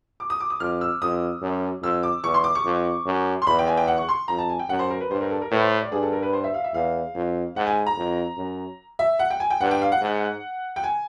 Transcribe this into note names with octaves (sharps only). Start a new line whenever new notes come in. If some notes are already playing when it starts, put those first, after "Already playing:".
D6
D#6
D6
D#6
F2 F6
E6
F2 D#6
F#2
F2 E6
D6
E2 C#6
C6
D6
C#6
F2
F#2
C6
E2 B5
G5
G#5
G5
F#5
C#6
C6
F2 A#5
A5
G#5
G5
F#2 F#5
C5
A#4
B4
G2 C5
A#4
A4
A#4
A2 B4
C5
D5
G2 G#4
A4
A#4
B4
C5
E5
F5
E5
E2 F5
F2
G#2 F#5
G#5
A#5
F2
F#2
E5
F#5
G5
G#5
G5
G2 F#5
G5
F5
F#5
G#2
G5
G#5